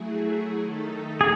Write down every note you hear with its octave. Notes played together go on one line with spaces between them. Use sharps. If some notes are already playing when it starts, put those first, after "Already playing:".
Already playing: F#3 A3 E4 G#4
D#3 A3 D#4 A4
G#4